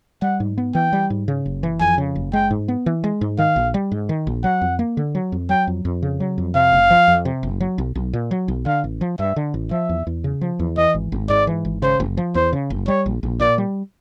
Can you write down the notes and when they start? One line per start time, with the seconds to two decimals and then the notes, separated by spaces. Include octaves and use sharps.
0.22 G3 F#5
0.40 G#2
0.58 B3
0.75 E3 G5
0.93 G3
1.10 G#2
1.28 C#3
1.46 F#1
1.63 E3
1.81 F2 G#5
1.98 C#3
2.15 F#1
2.33 G#3 G5
2.51 G#2
2.68 B3
2.86 E3
3.04 G#3
3.21 G#2
3.38 D#3 F5
3.56 A#1
3.74 G3
3.92 G#2
4.09 D#3
4.27 A#1
4.44 F#3 F#5
4.61 F2
4.79 A#3
4.97 D3
5.15 F#3
5.32 F2
5.49 F#3 G5
5.67 F2
5.85 F2
6.03 C#3
6.20 F#3
6.38 F2
6.55 C3 F5
6.73 F#1
6.90 F3
7.08 F2
7.25 C3
7.43 F#1
7.60 F#3
7.78 B1
7.95 B1
8.13 A#2
8.31 F#3
8.48 B1
8.66 D3 F5
8.84 A1
9.01 F3
9.19 G2 E5
9.36 D3
9.54 A1
9.71 F3 E5
9.89 E2
10.07 E2
10.24 C#3
10.41 F3
10.59 E2
10.77 E3 D#5
10.95 G#1
11.12 G#1
11.29 G#2 D5
11.47 E3
11.65 G#1
11.82 C#3 C5
12.00 F#1
12.17 F3
12.35 E2 C5
12.53 C#3
12.70 F#1
12.88 G3 C#5
13.06 A#1
13.23 A#1
13.40 A#2 D5
13.58 G3